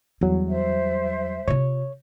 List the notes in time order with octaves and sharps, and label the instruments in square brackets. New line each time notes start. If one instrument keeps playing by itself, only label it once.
[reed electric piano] E2 F#3 [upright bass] G3
[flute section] C5 E5
[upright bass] C3 F4 [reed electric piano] C#5